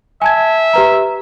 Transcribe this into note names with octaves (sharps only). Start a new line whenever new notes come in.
E5 G#5 A5 G#6
G4 B4 A#5